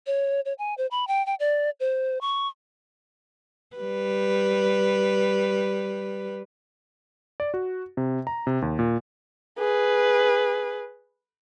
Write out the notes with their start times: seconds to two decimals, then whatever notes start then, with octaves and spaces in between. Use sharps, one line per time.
0.07 C#5
0.45 C#5
0.58 G#5
0.78 C5
0.91 B5
1.08 G5
1.26 G5
1.40 D5
1.80 C5
2.21 C#6
3.77 G3 B4
7.40 D5
7.54 F#4
7.97 C3
8.27 A#5
8.47 C3
8.62 D#2
8.79 A#2
9.59 G#4 B4